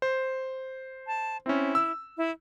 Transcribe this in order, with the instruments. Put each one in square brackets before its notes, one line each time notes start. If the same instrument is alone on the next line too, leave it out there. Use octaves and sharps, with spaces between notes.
[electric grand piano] C5
[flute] A5
[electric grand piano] C4 C#4 [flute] E4
[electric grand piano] E6
[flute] E4